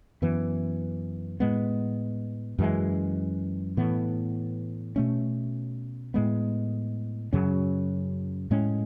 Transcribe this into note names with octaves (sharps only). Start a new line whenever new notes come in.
F#2 E3 B3
A2 G#3 B3
F#2 E3 G#3
A2 E3 B3
B2 A3 C#4
A2 G#3 B3
F#2 C#3 F#3 C#4
A2 G#3 C#4